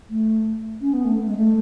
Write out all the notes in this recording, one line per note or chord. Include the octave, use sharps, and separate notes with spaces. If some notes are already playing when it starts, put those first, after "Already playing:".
A3
C#4
B3
A3
G#3
A3